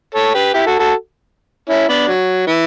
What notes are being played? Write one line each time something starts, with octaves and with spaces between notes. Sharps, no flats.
A4 C#5
G4 B4
E4 G4
F#4 A4
F#4 A4
C#4 E4
B3 D4
F#3
E3